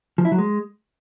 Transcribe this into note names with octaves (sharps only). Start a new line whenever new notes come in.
F3
E4
F#3
G#3